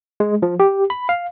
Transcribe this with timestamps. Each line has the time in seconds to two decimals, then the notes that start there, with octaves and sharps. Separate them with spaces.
0.20 G#3
0.42 F3
0.60 G4
0.90 B5
1.09 F5